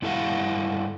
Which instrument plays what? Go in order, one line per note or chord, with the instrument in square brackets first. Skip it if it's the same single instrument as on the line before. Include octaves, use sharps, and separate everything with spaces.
[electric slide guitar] G2 E4 A4 F5 F#5